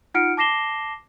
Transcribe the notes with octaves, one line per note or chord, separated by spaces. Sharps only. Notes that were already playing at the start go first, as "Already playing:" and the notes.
D#4 F4 F#5 F6 C#7 D7
A5 D6 A#6 C7 E7 G7